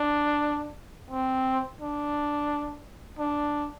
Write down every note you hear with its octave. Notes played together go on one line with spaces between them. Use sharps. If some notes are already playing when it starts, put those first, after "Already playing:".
Already playing: D4
C4
D4
D4